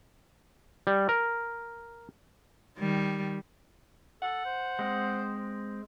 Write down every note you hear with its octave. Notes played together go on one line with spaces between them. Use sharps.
G3
A#4
D#3 G3
A4 F#5
C5
G#3 C4